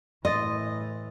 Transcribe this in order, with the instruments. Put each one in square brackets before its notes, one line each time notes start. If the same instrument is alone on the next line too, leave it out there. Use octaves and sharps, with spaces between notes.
[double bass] A2 E3 [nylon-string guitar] D#5 [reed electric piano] C6 D#6 A6